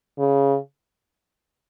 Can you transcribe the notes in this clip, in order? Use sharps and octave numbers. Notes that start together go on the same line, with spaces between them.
C#3